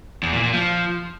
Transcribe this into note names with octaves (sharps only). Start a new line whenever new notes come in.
E2
A#2
A#2
F3